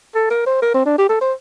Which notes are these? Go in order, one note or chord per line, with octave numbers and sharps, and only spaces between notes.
A4
A#4
C5
A#4
C4
D4
G4
A4
C5